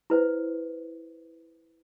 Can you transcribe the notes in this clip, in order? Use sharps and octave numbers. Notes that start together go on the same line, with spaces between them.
E4 B4 C5